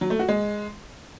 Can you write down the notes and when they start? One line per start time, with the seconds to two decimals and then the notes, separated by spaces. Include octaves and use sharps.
0.01 F#3
0.10 A3
0.19 F#4
0.28 G#3